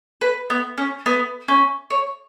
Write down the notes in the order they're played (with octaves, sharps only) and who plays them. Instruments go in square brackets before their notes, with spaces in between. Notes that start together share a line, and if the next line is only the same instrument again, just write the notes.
[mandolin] B4
B3
C#4
B3
C#4
C#5